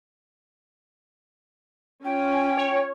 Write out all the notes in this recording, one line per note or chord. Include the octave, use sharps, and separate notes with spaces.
C#4 F4 G5 G#5
C#5